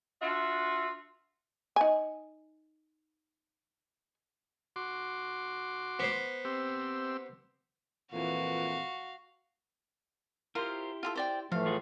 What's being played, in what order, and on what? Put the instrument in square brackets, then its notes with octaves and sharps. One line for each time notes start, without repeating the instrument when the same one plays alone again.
[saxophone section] D4 F4 F#4 E5
[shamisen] D#4 G#5
[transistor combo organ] F#4 C6 D6
[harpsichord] B3 C5
[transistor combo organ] C4 G4 E6
[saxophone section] F2 A#2 E3 [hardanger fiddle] F#4 F5
[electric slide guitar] E4 G4 [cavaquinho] F4 A#4 C5
[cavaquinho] F4 G#4 A4
C5 D5 G5
[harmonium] A2 E3 A3 [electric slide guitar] F3 [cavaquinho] F5
[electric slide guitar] F4 F#4 G#4